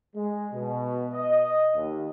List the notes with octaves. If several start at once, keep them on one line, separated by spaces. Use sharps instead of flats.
G#3
B2
D#5
D#2